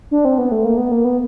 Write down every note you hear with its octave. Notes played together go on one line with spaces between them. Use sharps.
D4
C4
B3
A3
A#3
B3
A#3
B3